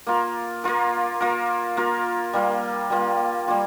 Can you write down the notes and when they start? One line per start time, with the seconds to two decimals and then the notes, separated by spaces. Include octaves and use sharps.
0.07 A#3 F4 A#4
0.64 A#3 F4 A#4
1.20 A#3 F4 A#4
1.77 A#3 F4 A#4
2.33 G3 A#3 F4
2.90 G3 A#3 F4
3.48 G3 A#3 F4